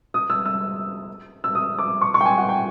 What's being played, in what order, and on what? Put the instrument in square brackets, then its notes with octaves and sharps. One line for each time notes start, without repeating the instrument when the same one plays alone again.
[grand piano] D#6
E6
E6
E6
D#6
D6
C#6
C#6
G5
G#5
F#5
G5